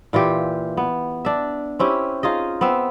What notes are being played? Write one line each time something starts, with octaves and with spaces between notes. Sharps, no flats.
A#2 E3 F4 G4
B3
D4 E5
C4 C#4 E4 G4
D#4 F4 G#4 D#5
B3 C4 E5